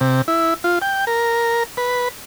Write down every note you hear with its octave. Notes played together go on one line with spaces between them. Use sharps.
C3
E4
F4
G5
A#4
B4